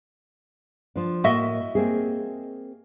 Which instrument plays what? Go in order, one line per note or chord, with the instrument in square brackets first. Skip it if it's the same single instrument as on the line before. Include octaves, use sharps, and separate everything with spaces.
[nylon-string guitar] F3 D4
[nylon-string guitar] A2 A#3 [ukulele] F#4 D#5 E5
[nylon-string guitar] A#3 C4 G#4